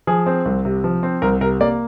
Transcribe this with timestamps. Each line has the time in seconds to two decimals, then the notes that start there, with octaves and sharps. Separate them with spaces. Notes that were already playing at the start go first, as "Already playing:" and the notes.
0.07 F3 G#4
0.26 C4
0.45 C2
0.65 C3
0.84 F3
1.03 C4
1.22 C2 A#4
1.41 C3 A#4
1.61 A#3 D5